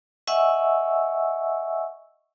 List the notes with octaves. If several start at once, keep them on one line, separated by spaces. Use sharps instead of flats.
D#5 E5 F#5 G#5 C#6 E6